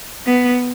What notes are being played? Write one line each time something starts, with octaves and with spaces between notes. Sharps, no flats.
B3